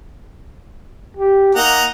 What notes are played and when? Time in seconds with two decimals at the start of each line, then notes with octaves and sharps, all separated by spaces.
1.17 G4
1.55 A#3 D#4 F#5 A#5